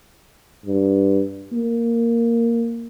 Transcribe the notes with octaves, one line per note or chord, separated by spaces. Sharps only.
G2
A#3